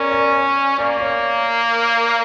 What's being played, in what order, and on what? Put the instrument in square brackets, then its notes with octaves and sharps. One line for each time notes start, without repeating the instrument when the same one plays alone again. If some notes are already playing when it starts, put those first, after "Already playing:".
Already playing: [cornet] C#4 [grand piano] A#4 C#5 D5
[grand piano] D5
[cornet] A#3 [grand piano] D5
[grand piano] C#5